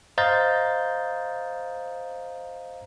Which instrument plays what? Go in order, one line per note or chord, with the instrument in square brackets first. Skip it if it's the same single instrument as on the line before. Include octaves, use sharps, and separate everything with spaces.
[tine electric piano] C5 D#5 F5 A#5 G6 A6